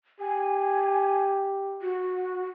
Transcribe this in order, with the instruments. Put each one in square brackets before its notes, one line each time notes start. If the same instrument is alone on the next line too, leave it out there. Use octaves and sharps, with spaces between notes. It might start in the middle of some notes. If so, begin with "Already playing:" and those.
[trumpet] G4 [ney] G#5
[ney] F#4